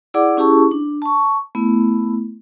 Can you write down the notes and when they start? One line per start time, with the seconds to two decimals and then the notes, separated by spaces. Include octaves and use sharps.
0.14 E4 G#4 D5 F#5 D6
0.37 C#4 E4 G4 G#4 A5 C#6
0.71 D4
1.02 A5 C#6
1.55 A3 B3 E4